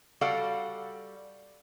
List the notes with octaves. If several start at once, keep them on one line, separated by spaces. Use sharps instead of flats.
G3 F#4 A4 D5 F5 F#5